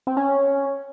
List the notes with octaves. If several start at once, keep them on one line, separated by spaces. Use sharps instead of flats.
C4
C#4